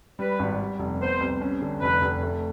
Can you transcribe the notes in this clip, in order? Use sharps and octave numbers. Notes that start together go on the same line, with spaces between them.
G3 B4
G#1
G3
F1
B3 C5
C2
C#4
D3
F1 B4
F1
A3